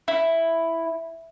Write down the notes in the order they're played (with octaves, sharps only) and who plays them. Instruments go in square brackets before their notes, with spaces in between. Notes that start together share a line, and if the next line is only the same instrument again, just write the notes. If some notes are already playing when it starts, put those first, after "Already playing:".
[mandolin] E4